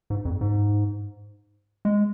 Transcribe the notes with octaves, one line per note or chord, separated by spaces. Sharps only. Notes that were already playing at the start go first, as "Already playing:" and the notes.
G#2
F2
G#2
G#3